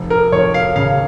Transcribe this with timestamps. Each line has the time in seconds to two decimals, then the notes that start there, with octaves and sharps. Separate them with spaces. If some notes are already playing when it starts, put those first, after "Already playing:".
Already playing: F1
0.10 A#4
0.32 F1 C#5
0.54 F5
0.76 C#3 F5